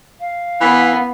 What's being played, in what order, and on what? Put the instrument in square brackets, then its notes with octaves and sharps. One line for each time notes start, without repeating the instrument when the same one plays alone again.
[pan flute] F5
[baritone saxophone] E3 [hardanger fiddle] B3